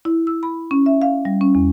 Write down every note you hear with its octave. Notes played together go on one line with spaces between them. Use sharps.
E4
E6
B5
C#4
E5
F5
G3
C#4
E2